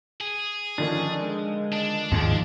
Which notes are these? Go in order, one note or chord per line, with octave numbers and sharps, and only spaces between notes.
G#4
D3 D#3 F3 C#4 D4
G#3
D4
D#2 G#2 F3 G#3